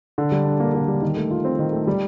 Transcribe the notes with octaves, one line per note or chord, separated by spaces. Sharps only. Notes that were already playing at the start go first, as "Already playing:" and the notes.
D3
G3
D4
A#3
D3
G3
D#3
A3
F4
C4
D#3
A3
G3